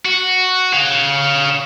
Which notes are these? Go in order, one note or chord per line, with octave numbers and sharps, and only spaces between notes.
F#4
C#5 F5